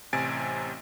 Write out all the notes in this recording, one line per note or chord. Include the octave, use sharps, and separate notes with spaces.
A1 C3 G#5 A6 D7